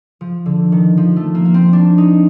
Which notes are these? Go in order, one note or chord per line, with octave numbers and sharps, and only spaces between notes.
F3
D3
D#3
F3
A3
A#3
A#3
C4
D4
D#4